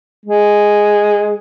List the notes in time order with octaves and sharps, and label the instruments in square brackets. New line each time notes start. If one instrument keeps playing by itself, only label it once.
[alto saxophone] G#3